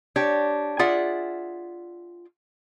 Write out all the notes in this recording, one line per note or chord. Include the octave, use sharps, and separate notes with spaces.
D4 G4 C#5
F4 G#4 D5 E5 F#5